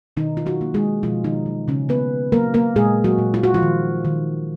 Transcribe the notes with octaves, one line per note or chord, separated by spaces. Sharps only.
B2 D#3 D#4
F4
F#3 F#4
A#3
G#3 G#4
B2 F3 F4
D#3 D#4
F#3
C#3 C#4
A#3 B3 B4
F#3 A#3 A#4
A#3 A#4
A#2 G#3 G#4
F#3 F#4
A#2
F4
F#4
F3 F4
D#3
D#3